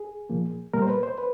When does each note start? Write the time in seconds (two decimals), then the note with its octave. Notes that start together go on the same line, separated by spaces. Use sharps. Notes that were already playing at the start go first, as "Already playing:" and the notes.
Already playing: G#4
0.30 A#2 F3 A#3
0.74 A#2 G3 A#3 A#4
0.82 C5
0.89 B4
1.03 C5
1.18 B4